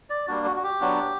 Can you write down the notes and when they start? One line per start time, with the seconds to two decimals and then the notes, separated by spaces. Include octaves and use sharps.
0.10 D5
0.28 G3 A#3 D4 F#4
0.46 F#4
0.56 F#4
0.63 G4
0.81 F#3 B3 D4 F#4